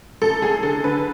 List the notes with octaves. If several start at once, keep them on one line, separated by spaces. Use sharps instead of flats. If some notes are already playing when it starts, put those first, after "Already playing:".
F#2 A4
F#2 G#4
D3 A4
D3 B4